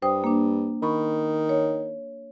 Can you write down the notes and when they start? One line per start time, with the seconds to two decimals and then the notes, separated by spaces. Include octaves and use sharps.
0.02 G2 C5 G5 D#6
0.24 A#3 D4
0.83 D#3 B5 C#6
1.49 C#5